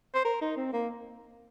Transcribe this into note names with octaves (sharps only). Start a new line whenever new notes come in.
C5
A#4
D#4
C4
A#3